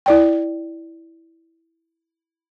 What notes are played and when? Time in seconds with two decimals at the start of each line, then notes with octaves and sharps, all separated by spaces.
0.06 E4 D5 G5